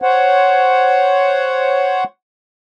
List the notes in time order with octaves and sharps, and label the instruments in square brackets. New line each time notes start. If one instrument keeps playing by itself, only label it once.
[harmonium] C5 C#5 F#5